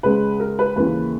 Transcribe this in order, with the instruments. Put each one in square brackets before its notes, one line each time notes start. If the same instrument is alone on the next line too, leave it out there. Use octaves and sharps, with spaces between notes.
[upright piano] C#2 C#3 G#3 B4
A#4
B4
D#2 C#3 E3 A#3 B4